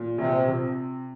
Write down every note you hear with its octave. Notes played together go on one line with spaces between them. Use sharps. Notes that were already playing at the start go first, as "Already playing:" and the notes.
Already playing: A#2
A#1 C3
C3